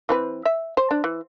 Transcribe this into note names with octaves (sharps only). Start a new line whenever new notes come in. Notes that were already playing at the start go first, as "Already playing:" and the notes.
E3 C4 B4
E5
C5
D4
E3